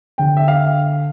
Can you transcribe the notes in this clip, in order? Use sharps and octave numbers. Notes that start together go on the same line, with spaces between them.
D3 G5
E5
F5